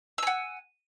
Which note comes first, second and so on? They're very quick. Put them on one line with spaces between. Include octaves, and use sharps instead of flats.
E6 G#5 F#5